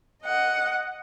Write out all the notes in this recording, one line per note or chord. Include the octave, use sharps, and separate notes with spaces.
D#5 F#5